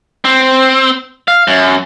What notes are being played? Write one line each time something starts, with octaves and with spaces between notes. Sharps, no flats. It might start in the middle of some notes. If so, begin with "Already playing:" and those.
C4
F5
F#2